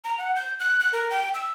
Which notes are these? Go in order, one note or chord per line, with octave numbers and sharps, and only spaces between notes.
A#5
F#5
G6
F#6
F#6
A#4
G5
E6